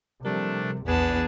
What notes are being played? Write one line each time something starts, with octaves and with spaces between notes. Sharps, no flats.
C3 F3 G3 A3 D4 A#4
A#1 E2 B3 D4 G#4 G#5 A5